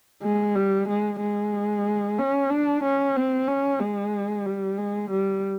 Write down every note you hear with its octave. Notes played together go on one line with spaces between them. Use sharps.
G#3
G3
G#3
G#3
C#4
D4
C#4
C4
C#4
G#3
G3
G#3
G3